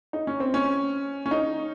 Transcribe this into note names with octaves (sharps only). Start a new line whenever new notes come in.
D#4
C#4
C4
C#4
C#4
D#4